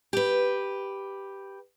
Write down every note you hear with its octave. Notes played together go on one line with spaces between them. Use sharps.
G4 B4